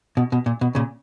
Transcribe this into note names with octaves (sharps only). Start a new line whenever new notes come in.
B2
B2
A#2
B2
A#2 C#3